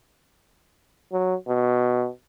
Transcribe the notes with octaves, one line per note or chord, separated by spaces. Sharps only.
F#3
B2